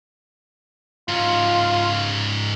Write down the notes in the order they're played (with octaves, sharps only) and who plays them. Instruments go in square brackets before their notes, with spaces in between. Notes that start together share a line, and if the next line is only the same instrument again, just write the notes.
[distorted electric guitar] G#2 C#4 [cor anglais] F4